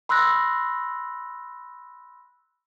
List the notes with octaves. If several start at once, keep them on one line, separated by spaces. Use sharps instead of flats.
B5 C6 E6 F#6 A#6